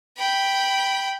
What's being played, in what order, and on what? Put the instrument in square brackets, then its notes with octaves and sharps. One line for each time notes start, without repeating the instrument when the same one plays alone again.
[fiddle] G5 B5